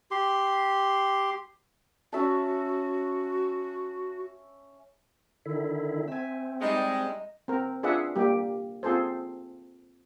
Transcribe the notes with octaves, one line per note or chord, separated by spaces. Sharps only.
G4 C6
C#4 F#4 E5 A5
D3 D#3 E4
C4 E5 G#5
G3 G#3 D#4 D#5
C4 A#4
D4 F4 G#4 B4 E5 F#5
G3 A#3 G4
C4 F4 G#4 A4 C5